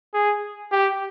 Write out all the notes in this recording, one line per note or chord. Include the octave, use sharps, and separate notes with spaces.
G#4
G4